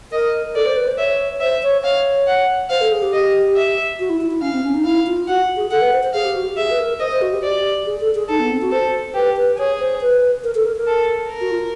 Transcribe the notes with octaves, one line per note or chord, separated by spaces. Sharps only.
A#4 D#5
A4 D5
C5
B4
C5
C#5 E5
C5 E5
C#5
C#5 F5
F#5
C5 F5
A4
G#4
G4
D#5
E5
F#4
E4
E4
E4
C#4 F5
C4
C#4
D#4
E4 F5
F4
F#4 F#5
G#4
A4 F#5
B4
C5
C5
G#4 F5
G4
F#4
G4
G#4 E5
B4
A#4
C5 D#5
C5
F#4
G4
G4 D5
G#4
A4
G#4
D#4 A4
B3
C4
F#4
A4 C5
G4 B4
B4
G#4 C#5
C5
B4
A#4
A4
A#4
A#4
A4
A#4
F#4
F4